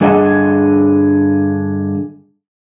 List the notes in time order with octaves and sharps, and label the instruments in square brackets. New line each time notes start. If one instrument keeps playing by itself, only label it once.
[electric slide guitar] G2 D3 G#4 A4 D#5 F#5